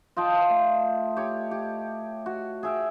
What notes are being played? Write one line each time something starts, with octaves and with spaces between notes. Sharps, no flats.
F4 D#5 G5 A5
A3
G4 C#5
G4
F#4
G#4 E5 G5